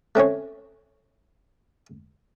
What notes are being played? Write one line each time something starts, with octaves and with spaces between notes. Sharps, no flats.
A3 C4 C#4 C#5